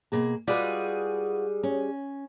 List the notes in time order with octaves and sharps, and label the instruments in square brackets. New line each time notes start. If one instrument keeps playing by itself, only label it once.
[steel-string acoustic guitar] B2 A#3 G#4
[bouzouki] G3 G#3 G#4 [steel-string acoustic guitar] F4 F#4 B4
[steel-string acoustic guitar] C#4